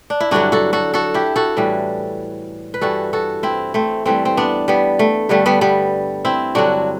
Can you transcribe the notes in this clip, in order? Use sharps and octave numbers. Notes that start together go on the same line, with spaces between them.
D4
E4
G2 D3 F#3 D4 F#4
F#4 A4
F#4 A4
F#4 A4
E4 G4
F#4 A4
A2 E3 G3
B4
G2 E3 G3 F#4 A4
F#4 A4
C4 E4
A3 C4
G2 E3 G3 A3 C4
C4
B3 D4
G3 B3
A3
G2 D3 G3 A3
G3 B3
G3 B3
C4 E4
G2 D3 F#3 D4 F#4